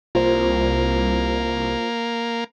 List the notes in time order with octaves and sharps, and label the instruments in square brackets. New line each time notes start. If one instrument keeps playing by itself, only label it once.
[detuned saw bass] C2 [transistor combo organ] A#3 [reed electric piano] F4 C5